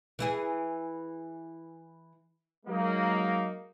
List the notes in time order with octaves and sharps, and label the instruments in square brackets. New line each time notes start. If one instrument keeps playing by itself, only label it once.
[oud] E3 E4 G#4
[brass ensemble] F#3 G#3 A#3 D#4